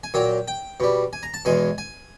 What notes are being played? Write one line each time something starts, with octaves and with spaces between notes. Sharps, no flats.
G#5
A#2 F#3 G5
G5
B2 G3
G#5
A#5
A5
E2 B2 G#3 G#5
G#5